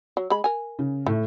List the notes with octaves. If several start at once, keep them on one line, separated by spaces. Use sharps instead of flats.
F#3
G#3 B5
A#4 G#5
C#3
A2 A3